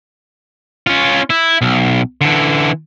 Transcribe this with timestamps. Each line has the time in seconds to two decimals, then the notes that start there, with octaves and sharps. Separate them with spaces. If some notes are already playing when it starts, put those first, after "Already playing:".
0.87 C#4 F4
1.30 E4
1.61 B1
2.21 D3 E3